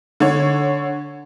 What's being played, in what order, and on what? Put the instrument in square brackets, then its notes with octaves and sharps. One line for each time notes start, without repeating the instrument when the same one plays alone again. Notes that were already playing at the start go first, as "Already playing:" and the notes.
[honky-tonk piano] D3 C#5